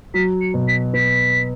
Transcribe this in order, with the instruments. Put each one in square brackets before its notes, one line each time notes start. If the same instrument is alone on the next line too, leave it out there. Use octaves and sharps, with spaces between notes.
[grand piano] F#3 [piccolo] B6
[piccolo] C#7
[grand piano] B2
[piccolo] B6
[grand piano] B3 [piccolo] B6